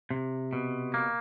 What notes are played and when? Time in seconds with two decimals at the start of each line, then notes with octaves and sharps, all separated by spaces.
0.11 C3
0.53 B2
0.94 A#3